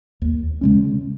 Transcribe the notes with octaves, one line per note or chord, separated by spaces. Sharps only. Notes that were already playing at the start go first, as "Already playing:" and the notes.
D#2
C#3 G#3 C#4